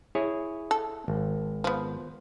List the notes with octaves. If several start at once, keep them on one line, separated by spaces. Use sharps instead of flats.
E4 G#4 C#5
A4
G#1
F3 B3